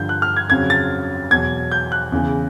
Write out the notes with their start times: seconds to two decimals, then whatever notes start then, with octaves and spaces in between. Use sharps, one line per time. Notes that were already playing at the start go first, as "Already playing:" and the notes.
Already playing: G2 D3 F3 G6
0.09 F#6
0.22 F6
0.36 G#6
0.50 F2 C#3 F#3 G#6
0.70 A6
1.31 E2 B2 F#3 G#6
1.72 G6
1.92 F#6
2.12 E2 C#3 E3